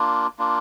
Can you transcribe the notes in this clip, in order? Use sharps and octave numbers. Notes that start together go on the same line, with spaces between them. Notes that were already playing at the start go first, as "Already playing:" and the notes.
Already playing: A#3 D4 F4
A#3 D4 F4